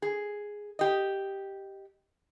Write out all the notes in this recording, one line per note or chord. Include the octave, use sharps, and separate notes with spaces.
G#4
G4 D#5